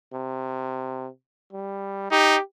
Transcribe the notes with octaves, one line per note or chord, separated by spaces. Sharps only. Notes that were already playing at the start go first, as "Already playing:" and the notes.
C3
G3
D#4 G4